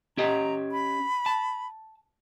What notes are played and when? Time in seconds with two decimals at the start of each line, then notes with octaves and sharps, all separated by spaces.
0.17 C#4 G4 D#5 A#5
0.72 B5
1.26 A5